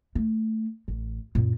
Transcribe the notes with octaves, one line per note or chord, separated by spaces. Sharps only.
A3
A1
F#2 A#2